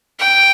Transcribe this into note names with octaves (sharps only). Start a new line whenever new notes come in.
G5